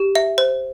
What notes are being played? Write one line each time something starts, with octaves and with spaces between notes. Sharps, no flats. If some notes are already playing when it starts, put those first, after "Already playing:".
Already playing: G4
E5
C5